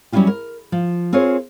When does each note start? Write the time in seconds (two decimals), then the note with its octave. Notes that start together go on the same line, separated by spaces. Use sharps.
0.12 F#3 G3 C#4 E4 F4 G4
0.27 A#4
0.72 F3
1.13 C4 F4 G#4 A#4 C#5